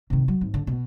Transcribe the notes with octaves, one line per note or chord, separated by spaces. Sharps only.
C3 D#3
F#3
G#1
D3
B2